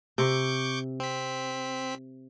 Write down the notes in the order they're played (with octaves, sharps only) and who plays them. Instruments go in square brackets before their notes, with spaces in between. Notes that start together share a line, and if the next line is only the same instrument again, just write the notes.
[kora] C3 [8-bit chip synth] C#6 D6 G6
[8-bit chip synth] C4 B6